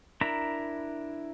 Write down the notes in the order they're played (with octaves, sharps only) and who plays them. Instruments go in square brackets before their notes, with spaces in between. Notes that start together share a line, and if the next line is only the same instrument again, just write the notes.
[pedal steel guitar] D4 E4 A#4 A#5 B5